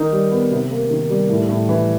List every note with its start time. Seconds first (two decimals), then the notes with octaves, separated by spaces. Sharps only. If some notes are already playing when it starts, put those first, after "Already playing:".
Already playing: D#3 D#4
0.12 G3
0.32 B3
0.51 C3
0.71 A#3
0.90 D#3
1.10 G3
1.30 A2
1.49 A2
1.69 E3